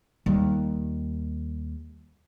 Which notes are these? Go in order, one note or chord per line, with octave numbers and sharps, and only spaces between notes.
D#2 G3